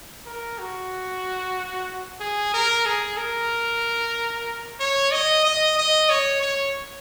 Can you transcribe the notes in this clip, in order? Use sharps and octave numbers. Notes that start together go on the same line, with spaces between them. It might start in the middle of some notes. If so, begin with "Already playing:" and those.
A#4
F#4
G#4
A#4
G#4
A#4
C#5
D#5
D#5
D#5
C#5
C#5